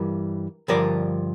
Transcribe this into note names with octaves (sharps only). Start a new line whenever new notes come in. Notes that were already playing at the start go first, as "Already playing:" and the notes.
Already playing: G2 E3 G3 A#4
G2 D3 F3 A#4 D5